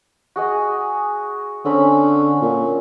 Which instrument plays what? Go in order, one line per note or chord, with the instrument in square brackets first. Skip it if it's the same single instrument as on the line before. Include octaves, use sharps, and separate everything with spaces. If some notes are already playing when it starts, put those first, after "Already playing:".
[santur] F#4 G#4 D#5
[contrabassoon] D3 [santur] C4 C#4 B5
[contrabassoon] A#2